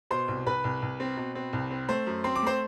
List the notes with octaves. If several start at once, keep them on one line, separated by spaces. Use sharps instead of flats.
B2 C5 C6
C2
C2 B4 B5
C2
C2
C4
B2
C4
C2
C4
A3 C5 C6
F#2
C4 C6
D6
A3 C5 C6